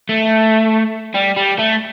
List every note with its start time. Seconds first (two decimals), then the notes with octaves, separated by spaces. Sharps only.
0.09 A3
1.14 G3
1.36 G3
1.59 A3